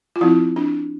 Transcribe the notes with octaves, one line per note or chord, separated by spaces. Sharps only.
F4
F3 C4 E4
D4